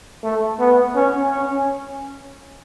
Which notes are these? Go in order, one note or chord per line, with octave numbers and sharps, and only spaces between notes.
A3
B3
C#4
C#4